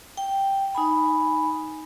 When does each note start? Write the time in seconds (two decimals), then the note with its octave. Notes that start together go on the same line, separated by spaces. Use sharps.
0.17 G5
0.75 D#4 G#5 B5